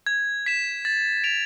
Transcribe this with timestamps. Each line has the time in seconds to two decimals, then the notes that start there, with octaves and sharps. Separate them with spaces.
0.06 G#6
0.46 B6 E7
0.85 A6
1.24 D7 F7